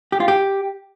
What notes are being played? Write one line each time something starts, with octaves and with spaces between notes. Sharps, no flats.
G4
F4
G4